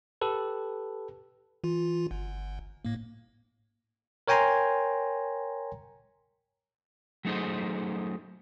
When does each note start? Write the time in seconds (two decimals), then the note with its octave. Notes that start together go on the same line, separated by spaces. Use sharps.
0.21 G4 A4 B4
1.64 E3 F4
2.11 G1
2.85 A2 A#3
4.28 A#4 C#5 G5 G#5 A#5 C6
7.25 F#3 A3 D#4 G#4 C5